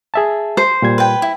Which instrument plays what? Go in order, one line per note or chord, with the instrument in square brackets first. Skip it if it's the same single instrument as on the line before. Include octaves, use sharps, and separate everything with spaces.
[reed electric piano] G#4 E5 A5
[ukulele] C5
[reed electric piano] A#2 G3 G#6
[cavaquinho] B4 G5
E4